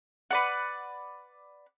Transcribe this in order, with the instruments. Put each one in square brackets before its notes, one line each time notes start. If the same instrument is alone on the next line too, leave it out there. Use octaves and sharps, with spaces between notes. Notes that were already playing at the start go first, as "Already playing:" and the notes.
[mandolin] B4 D5 F#5